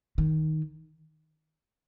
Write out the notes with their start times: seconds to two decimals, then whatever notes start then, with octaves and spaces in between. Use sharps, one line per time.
0.18 D#3